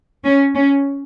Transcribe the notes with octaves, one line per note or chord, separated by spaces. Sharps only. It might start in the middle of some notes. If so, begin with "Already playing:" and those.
C#4
C#4